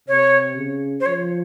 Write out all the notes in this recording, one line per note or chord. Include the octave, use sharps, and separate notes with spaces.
C3 C#5
C#3
C5
F3 C#5